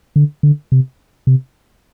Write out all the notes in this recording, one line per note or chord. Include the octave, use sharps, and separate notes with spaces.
D3
D3
C3
C3